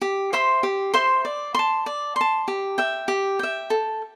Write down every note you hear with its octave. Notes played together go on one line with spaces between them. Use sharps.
G4
C5 E5 C6
G4
C5 E5 C6
D5
A5 C6
D5
A5 C6
G4
E5 G5
G4
E5 G5
A4